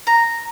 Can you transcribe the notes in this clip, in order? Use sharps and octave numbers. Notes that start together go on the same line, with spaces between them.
A#5